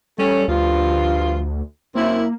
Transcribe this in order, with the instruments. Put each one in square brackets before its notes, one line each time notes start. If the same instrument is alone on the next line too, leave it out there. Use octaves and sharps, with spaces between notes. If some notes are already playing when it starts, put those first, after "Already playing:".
[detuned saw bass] G3 [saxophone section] A3 C#4
[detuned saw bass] D2 [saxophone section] G2 F3 F4
[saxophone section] F#2 C4 E4 [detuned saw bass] A#3